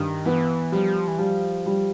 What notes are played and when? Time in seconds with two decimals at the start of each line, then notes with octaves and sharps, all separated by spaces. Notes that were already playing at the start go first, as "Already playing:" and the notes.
Already playing: G2 D#3
0.26 E3 B3
0.72 F3 G3
1.08 E3
1.18 F3 G3
1.66 G3